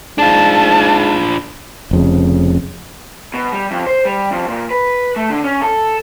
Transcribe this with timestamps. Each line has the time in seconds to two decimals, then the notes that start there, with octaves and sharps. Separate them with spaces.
0.18 G#2 D4 F4 A5
1.91 F1 F2 C#3
3.34 B2
3.52 G3
3.71 F2
3.87 C5
4.05 G3
4.31 F2
4.48 A#2
4.71 B4
5.16 A3
5.30 D3
5.44 C#4
5.62 A4